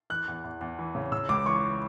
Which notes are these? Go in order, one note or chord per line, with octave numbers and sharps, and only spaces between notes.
E3 F#6
E2
E2
E2
E3
C#3
C#3 E6
C#2 D6
E3 C#6